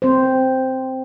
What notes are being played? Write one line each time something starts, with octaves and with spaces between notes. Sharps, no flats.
C4 C5